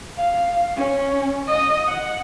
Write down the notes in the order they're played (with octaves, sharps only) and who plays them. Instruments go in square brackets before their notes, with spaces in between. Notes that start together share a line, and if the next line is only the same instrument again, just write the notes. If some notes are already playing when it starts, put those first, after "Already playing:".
[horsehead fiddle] F5
C#4
D#5
F#5